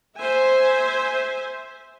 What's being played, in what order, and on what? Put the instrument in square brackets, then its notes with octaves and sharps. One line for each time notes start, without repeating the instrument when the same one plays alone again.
[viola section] C5 E5 G#5